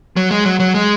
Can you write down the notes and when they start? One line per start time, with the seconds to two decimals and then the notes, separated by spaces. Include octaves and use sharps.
0.16 F#3
0.31 G#3
0.45 F#3
0.60 F#3
0.74 G#3